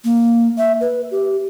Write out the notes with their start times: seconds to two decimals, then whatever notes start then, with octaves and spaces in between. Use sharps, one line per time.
0.04 A#3
0.58 E5
0.81 B4
1.11 G4